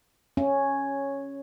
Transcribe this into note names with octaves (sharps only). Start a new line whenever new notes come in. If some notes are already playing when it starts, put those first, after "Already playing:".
C#4